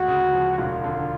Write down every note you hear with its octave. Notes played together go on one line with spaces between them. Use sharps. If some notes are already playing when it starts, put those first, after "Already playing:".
Already playing: D2 G#3 F#4
C#3
F3
E1 F4
D3